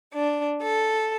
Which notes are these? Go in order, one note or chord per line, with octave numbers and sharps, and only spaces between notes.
D4
A4